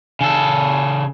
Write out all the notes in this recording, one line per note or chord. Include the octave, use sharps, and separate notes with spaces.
C#3 A4